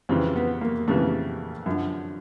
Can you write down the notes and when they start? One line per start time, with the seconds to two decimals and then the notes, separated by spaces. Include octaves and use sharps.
0.09 F2 C#3 E3 C4
0.36 B3
0.61 A#3
0.88 F2 C#3 E3 A3
1.66 F#2 D3 F3